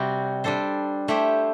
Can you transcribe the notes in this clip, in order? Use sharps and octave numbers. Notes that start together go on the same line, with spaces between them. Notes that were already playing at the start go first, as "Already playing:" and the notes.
Already playing: C3 G3 C4 F#4
G3 D4 A4 C5
A3 E4 G4 C5